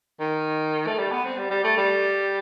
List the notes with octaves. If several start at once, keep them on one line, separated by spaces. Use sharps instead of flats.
D#3
A3
G3
B3
C4
G3
G3
A3
G3